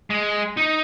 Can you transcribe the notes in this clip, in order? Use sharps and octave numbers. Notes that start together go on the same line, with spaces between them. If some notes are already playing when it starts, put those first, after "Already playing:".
G#3
D#4